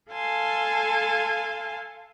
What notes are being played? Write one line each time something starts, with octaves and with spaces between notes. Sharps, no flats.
A4 F5 G#5 A5 C6